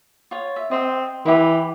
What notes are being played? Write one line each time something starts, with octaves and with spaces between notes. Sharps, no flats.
F4 C#5
E5
C4 D#5 G5 D#6
E3 E4 G4